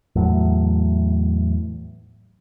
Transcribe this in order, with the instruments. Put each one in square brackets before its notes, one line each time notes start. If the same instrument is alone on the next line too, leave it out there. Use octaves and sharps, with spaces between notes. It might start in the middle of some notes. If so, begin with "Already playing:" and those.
[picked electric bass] E2 A2 F#3